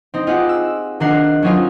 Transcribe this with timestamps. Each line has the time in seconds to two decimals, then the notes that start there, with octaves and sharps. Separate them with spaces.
0.14 C4 D#4
0.27 D#4 F4 G4 G#4 F#5
0.49 E6
1.00 D#3 A#3 D4 A#4 F#5 C7
1.42 F#3 C4 C#4 D#4 F4